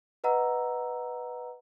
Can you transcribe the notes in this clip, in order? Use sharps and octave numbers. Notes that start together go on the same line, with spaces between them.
B4 D#5 F#5 A#5 E6